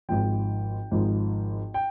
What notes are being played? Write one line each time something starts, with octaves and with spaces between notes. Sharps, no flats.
G#1 G#2 F3 G5
G#1 G#2 F3
G5